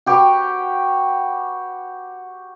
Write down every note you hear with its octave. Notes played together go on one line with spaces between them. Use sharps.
F#4 G4 B4 F#5